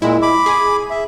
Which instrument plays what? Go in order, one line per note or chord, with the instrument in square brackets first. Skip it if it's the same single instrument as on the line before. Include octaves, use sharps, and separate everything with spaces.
[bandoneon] A#2 G#3 [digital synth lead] E4
[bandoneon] B5 D6
[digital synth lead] G#4
[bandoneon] E5